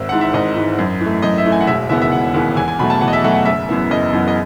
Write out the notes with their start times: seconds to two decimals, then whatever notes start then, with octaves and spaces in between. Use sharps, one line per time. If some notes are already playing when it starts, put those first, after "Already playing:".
Already playing: G#1 E5
0.09 G#2 E3 F#5
0.21 E5
0.33 G#1 D#5
0.56 G#2 E3
0.79 F#2
1.01 E3 A3
1.22 F#2 D#5
1.38 E5
1.46 E3 A3
1.52 G#5
1.61 F#5
1.67 E1 E5
1.89 D#2 C#3 E3 B3 E5
2.01 E5
2.12 E1 F#5
2.34 D#2 C#3 E3 B3
2.56 E2 G#5
2.68 G#5
2.79 B2 F#3 A3 B5
2.90 A5
3.01 E2 F#5
3.08 D#5
3.13 E5
3.24 B2 F#3 A3 F#5
3.34 F#5
3.45 F#1 E5
3.69 F#2 E3 B3
3.90 F#1 D#5
4.13 F#2 E3 B3
4.28 D#5